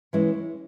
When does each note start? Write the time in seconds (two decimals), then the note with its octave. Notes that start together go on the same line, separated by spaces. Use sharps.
0.13 E3 G#3 C#4 E4